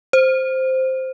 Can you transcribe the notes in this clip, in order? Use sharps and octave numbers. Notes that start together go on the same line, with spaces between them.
C5